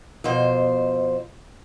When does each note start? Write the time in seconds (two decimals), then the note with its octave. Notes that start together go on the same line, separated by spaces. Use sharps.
0.24 F2 B2 C5